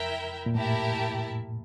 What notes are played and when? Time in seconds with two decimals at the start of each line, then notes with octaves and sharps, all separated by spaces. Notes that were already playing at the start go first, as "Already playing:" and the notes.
Already playing: F2 E4 A#4 E5 G5
0.46 A#2
0.54 A2 E4 G4 A#4 E5 A5